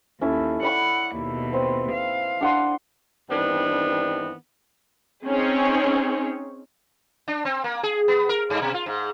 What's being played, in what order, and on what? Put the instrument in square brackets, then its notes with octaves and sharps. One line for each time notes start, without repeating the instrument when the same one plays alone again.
[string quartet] D#2 [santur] C#4 E4 A4
[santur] D5 B5 C#6 [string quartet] F#5
[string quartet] D#2 B2
[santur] C4 B4
[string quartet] F5
[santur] D4 F#5 C6
[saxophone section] G2 D#3 E3 B3 C4 D4
[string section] C4 C#4 D#4 G#4 C#5
[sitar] D4
C4
A#3
G#4
B3
A#4
G2
B2
F4
G#2